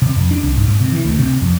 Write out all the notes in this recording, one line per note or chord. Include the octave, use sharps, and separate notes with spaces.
C3
F2
D4
C2
G#2
G#2
C3
E3
D2
C3
F2